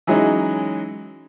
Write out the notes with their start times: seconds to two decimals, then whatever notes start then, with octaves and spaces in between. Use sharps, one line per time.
0.07 E3 F#3 G#3 C#4 D#4 E4